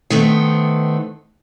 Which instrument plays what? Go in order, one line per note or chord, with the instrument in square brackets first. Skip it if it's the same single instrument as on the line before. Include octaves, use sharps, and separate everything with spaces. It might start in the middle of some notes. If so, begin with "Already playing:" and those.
[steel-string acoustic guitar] D#3 A3 B3 C4